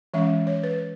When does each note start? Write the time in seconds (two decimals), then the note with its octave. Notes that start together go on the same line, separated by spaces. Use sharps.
0.14 E3 G#3 C#4 E5
0.47 C#5
0.63 B4